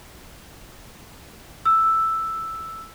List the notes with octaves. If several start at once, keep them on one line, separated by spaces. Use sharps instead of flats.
E6